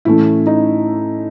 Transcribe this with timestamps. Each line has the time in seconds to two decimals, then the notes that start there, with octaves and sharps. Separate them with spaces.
0.05 A2 E3 A3 C#4 E4
0.47 D#4